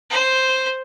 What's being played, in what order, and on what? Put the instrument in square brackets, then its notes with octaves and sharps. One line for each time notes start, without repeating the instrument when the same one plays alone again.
[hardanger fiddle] C5